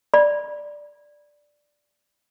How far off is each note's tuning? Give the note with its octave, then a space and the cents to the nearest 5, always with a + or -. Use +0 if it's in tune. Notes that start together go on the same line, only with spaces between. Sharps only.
D5 +0 B5 -30